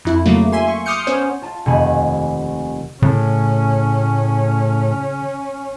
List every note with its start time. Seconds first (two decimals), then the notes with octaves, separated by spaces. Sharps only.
0.05 F2 E4
0.26 C#3 F#3 A3 A#3
0.52 E5 G#5 C6
0.68 C#6
0.86 C6 D6 D#6 F6 G6 C#7
1.07 B3 C#4 C5 C#5
1.42 F4 A5
1.66 F1 D#2 D#3 G#5 B5
3.02 A2 C#3 C#4